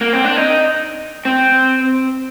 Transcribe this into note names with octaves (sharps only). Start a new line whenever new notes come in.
A#3
C4
D4
D#4
C4